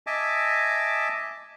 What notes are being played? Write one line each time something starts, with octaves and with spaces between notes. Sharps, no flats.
D#5 E5 G#5 A5 D6